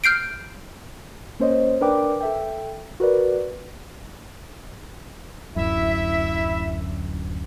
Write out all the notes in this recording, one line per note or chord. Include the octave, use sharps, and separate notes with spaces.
F6 G6 C7 D7
A#3 C#4 C5 C#5 D#5
D4 A#4 B4 D5 G5 D6
A4 E5 G5
F#4 A#4 B4 D5
D1 F#2 E4 E5